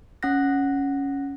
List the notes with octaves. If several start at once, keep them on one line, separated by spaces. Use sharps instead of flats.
C#4 F#5 F#6 A#6